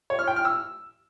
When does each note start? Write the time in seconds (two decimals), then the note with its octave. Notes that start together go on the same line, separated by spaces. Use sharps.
0.10 C#5
0.19 F6
0.28 G5
0.36 F6
0.45 E6